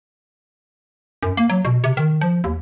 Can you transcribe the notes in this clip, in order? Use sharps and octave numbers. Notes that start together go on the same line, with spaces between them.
F#2
A#3
F#3
B2
C3
D#3
F3
D#2